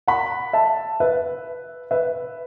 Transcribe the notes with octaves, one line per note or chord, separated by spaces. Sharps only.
F#5 B5
E5 A5
B4 E5
B4 E5